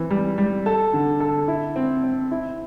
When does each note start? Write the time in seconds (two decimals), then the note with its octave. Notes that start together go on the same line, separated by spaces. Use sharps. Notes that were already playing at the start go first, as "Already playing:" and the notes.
Already playing: E3 C4
0.10 G3
0.38 G3
0.66 A4
0.93 D3
1.20 A4
1.48 E4
1.76 C4
2.04 C4
2.31 E4